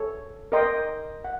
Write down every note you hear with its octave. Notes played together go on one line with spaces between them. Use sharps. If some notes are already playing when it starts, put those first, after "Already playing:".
Already playing: A4 C#5
A#4 D#5 G5 C6
F#5